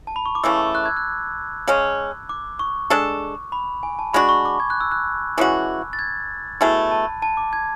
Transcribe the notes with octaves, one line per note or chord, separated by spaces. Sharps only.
A5
B5
C#6
D6
C#3 E3 A3 E6
F#6
G#6
F#6
C#3 G#3 C#4
D6
C#6
G#3 D4 A4
B5
G#5
A5
G#3 D4 F#4 B5
C#6
D6
G#6
F#6
E6
F#6
E3 G#3 C#4 F#4
A6
G#6
B2 A3 E4 G#4 B5
A5
A5
D6
G#6